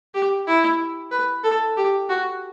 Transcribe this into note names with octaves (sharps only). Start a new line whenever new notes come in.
G4
E4
B4
A4
G4
F#4